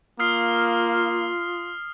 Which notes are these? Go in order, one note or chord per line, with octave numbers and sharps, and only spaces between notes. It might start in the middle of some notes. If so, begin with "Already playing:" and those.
A#3 F4 D#6 F6 C7